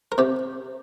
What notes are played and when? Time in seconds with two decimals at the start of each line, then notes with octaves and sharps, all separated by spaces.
0.12 A#4
0.18 C3 G4